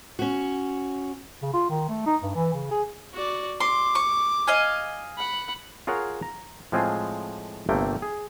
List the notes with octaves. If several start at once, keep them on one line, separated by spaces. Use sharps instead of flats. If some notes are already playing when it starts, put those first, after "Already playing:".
C#4 F#4
C#3
F4
D#3
A3
D#4
G2
E3
C#3
G#4
F#4 D5
C6 D6
C#6
D#5 F5 G#5
F#5 B5
F4 G#4 A#4 C#5 F5 F#5
A#5
A2 F3 G#3 C4 F4 G#4
G1 C3 A3 A#3 G5
G#4